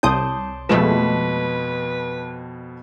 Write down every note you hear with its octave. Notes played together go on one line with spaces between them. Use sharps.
C2 A5 C6 D6 D#6 G6
F2 B2 F3 G#3 A3 B4 E7